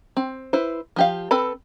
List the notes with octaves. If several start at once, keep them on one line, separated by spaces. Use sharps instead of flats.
C4
E4 B4 C5
F3 G4 F5
C4 A4 B4 B5